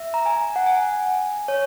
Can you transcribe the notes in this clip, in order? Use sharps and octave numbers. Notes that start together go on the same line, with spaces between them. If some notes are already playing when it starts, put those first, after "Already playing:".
Already playing: E5
A#5
G#5
F#5
G#5
C#5